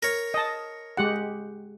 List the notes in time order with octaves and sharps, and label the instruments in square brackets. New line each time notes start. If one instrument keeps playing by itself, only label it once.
[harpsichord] A#4 C#5
[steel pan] D#5 A5
G#3 G4 F#5